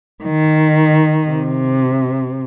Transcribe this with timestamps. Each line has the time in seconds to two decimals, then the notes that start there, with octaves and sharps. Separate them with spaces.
0.24 D#3
1.30 C3